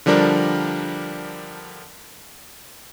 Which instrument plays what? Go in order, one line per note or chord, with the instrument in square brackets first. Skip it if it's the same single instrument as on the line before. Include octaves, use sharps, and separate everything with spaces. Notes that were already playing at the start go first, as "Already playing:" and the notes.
[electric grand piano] D3 F3 G3 D4 A#4